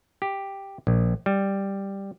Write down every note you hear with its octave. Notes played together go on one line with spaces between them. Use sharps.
G4
A#1
G3